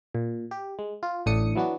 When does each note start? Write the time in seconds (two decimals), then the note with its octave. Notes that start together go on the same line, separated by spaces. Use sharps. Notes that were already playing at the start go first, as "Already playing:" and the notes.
0.15 A#2
0.51 G4
0.79 G#3
1.03 F4
1.26 A1 A2 D4 D#6 C#7
1.56 E3 F#3 B3 D4 F#4